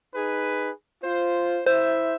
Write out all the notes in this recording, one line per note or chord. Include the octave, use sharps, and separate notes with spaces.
D#4 G#4 B4
F4 C5
E4 C5 E5